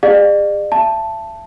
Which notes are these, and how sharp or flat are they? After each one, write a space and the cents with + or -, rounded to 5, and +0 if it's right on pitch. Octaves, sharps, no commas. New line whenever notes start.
G#4 -40 D5 +40 F5 +15
E5 +35 A5 +0